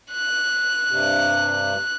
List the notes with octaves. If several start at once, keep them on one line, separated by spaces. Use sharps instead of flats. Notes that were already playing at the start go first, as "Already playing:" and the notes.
F#6
G2 C3